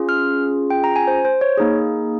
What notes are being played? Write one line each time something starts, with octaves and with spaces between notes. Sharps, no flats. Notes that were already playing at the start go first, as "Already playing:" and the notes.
Already playing: C#4 F4 G#4
F6
G5
A#5
G#5
C5
C5
C#5
A#3 D#4 G#4